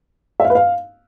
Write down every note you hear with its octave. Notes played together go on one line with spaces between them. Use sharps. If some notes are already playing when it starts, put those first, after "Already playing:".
E5
F5
B4
F5